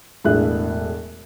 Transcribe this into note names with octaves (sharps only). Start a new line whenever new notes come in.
E1 A2 D4 G#4 E5 F#6